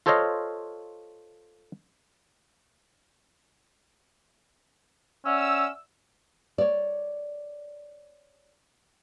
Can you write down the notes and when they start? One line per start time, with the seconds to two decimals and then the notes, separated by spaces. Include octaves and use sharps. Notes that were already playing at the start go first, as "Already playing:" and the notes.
0.06 F4 A4 C5 C#5 D#5 F5
5.25 C#4 D5 E5 F#5 E6
6.58 C#5 D5